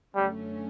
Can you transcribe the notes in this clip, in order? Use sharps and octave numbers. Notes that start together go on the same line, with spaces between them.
F#2 D3 F#3 G3 A3 C#4